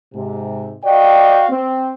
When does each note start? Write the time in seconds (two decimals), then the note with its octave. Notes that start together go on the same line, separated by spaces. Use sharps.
0.14 G#2 C3
0.84 F#4 D5 D#5 F5 G5
1.50 C4